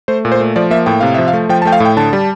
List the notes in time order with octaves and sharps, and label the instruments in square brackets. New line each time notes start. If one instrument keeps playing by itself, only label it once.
[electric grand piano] A3 C5
A#2
C5
A3
F3 D5
A#3 E5
A2 G5
C3 F5
F3 E5
F5
A3
F3 G5
A5
A3 G5
F5
A2
G5
D3 A5
G3